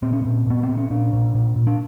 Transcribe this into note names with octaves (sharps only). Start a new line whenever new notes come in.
A#2 C4
C#4
A#2 C4
A#2 B3
C4
A#2
C#4
A#2 D4
A#2
A#2
A#2
D4